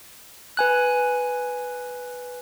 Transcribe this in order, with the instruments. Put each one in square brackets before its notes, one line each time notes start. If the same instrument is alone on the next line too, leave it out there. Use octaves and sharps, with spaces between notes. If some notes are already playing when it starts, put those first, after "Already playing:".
[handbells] B4 G#5 F#6